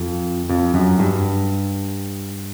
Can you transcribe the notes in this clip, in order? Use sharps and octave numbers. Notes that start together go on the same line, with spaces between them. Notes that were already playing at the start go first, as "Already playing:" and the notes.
Already playing: F2
F2
F#2
G2